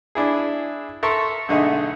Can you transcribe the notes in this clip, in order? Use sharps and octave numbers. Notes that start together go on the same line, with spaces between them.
D4 E4 G#4
A4 A#4 E5 A5 C6 C#6
B1 D3 A3 D#4 G#4 F#5